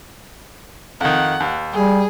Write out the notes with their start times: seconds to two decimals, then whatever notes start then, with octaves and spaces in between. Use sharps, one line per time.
1.01 F2 D#3 F#5
1.40 D#2
1.73 G3 G#4